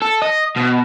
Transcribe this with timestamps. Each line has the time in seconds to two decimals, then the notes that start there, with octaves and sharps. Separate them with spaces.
0.02 A4
0.22 D#5
0.57 B2